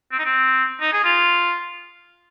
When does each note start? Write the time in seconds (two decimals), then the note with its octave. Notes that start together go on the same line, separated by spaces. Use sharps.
0.12 C4
0.19 D#4
0.25 C4
0.81 D#4
0.93 G#4
1.04 F4